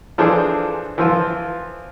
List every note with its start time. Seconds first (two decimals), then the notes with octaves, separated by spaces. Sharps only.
0.18 E3 F3 D4 G#4 A4 C5
0.98 E3 F3 F4